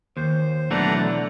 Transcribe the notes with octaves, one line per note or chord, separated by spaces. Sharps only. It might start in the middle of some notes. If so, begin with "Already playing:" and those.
D#2 C5
B1 E3 A3 D4 F#5 A#5
D3